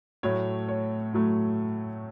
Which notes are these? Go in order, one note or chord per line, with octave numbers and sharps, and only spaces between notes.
A2 F#3 A3 C#5
C#5
A2 F#3 A3